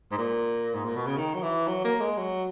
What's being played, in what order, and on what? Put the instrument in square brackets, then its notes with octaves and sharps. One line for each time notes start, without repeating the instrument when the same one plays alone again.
[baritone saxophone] G#2
A#2
G#2
A#2
B2
C#3
D#3
F#3
E3
F#3
A#3
G#3
F#3